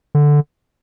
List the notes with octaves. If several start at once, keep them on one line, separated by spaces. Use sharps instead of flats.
D3